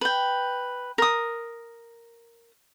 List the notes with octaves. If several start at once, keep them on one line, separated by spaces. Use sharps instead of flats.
B4 G5
A#4 D#6